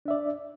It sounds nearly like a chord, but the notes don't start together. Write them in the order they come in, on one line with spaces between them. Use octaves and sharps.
D4 E5 D5